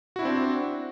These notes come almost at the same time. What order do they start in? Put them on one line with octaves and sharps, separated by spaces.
F#4 E4 D4 C4